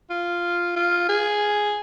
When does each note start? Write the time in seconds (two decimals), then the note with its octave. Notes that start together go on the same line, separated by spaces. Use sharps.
0.10 F4
0.76 F4
1.09 G#4